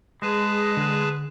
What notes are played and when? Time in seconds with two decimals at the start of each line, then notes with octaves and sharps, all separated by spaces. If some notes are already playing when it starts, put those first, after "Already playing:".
0.22 G#3 G#4 B4 A5
0.77 D3